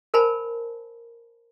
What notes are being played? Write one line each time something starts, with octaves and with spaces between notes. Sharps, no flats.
A#4 C5 G#5 A5 B5